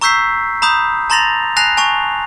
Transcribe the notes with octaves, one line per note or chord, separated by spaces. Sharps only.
A#5 C#6 E6 G6 B6 C7
A#5 B5 D#6 G6
A5 A#5 C6 A6 A#6 F7
G#5 A5 F#6 A#6 C7 F7
G#5 A5 C#6 F7